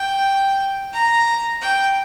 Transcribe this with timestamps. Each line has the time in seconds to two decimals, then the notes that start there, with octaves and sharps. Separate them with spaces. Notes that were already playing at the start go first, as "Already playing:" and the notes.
Already playing: G5
0.93 A#5
1.61 G5